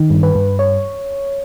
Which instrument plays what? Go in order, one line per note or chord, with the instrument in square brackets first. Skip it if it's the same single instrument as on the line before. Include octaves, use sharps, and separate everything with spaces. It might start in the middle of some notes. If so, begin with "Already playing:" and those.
Already playing: [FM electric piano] D#3
G2
B4
G2
C#5